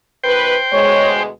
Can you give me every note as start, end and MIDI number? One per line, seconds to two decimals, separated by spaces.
0.24 0.56 47
0.24 0.56 51
0.24 0.56 71
0.24 1.23 72
0.24 1.23 79
0.73 1.28 38
0.73 1.28 47
0.73 1.28 56
0.73 1.13 73